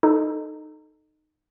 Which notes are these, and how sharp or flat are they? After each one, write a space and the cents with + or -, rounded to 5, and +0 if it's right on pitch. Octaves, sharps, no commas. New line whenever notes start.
D#4 -15 A4 +0